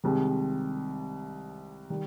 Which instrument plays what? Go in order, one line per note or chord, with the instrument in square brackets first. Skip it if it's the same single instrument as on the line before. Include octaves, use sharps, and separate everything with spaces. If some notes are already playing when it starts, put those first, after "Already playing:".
[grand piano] C2 C3 D#3 G#3
D#3 G3